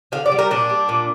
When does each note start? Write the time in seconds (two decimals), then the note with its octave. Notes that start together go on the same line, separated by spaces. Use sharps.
0.12 D3 F5
0.26 D5
0.32 G3
0.39 A#4
0.51 A#2 D4
0.70 G3
0.89 A#2